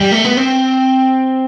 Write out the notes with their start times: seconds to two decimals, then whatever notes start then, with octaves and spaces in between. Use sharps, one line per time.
0.01 G3
0.12 A3
0.25 B3
0.37 C4